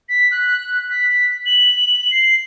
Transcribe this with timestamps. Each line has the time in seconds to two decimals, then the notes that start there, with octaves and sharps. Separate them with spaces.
0.09 B6
0.31 F#6
0.90 B6
1.46 F#7
2.11 C7